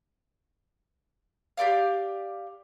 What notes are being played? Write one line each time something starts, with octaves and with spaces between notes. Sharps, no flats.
G4 A#4 D5 F5